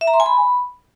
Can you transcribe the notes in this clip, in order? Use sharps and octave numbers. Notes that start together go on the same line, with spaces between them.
E5
A#5
C6
G#5
B5